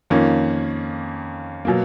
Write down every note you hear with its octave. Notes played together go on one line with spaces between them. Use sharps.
F2 D#3 A#3 C#4
B2 F#3 A#3